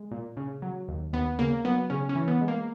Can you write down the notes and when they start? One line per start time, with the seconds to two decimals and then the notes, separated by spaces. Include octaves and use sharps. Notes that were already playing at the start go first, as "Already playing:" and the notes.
Already playing: G#3
0.11 A#2
0.37 C#3
0.62 F#3
0.88 D#2
1.13 D#2 B3
1.39 C#3 A#3
1.65 F#3 B3
1.90 C#3 C#4
2.09 C#4
2.15 E3
2.28 B3
2.41 G#3
2.48 A#3